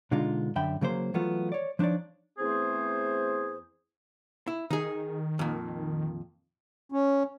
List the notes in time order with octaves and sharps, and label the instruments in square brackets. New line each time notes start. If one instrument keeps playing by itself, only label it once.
[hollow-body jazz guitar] B2 D3 G#3 D4 D#4 F4
F#2 D3 E5 G5 B5
C#3 F#3 A#3 C5
E3 F#3 A3 B3 F4
C#5 D5
F3 D4 D#4 C#5 D5
[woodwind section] E2 A3 C4 G#4 C5
[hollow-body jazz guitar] E4
[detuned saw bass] D#3 [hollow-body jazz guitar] D#4 G#4
[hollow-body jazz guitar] F2 A#2
[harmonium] C#4